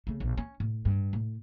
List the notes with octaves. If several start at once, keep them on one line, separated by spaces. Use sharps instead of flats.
C#3 A3
A#1 B2
C#4
A2
G2
A2